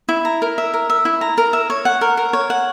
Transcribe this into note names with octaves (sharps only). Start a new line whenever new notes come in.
E4
A#5
A#4
E5
A#4
E5
E4
A#5
A#4
E5
C#5
F#5
A#4
A#4
C#5
F#5